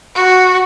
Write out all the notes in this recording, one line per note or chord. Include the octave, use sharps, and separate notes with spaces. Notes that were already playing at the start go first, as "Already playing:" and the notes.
F#4